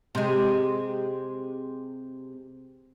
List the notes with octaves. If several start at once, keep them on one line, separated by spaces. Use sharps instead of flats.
C3 G#3